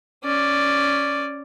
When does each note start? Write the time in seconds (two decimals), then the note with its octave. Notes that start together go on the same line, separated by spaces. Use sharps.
0.24 C#4 D5